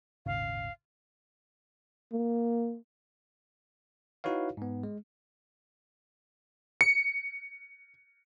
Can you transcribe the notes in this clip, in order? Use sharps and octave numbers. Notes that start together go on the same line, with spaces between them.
D#1 G#1 C#3 F5
A#3
D#4 E4 F#4 B4 C#5 F5
G#2 B3
G#3
C#7